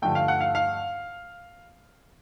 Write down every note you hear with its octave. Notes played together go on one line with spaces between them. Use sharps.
G2 D3 F3 A3 G5
F5
F#5
F5
F5